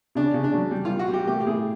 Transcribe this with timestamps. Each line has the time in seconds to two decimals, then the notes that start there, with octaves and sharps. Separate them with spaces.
0.15 C#3 D4
0.34 C#3
0.44 D4
0.54 F#3
0.71 G3
0.85 G3 F4
0.99 F#4
1.08 G3
1.14 G4
1.27 A3 G4
1.40 G4
1.47 A2 G#4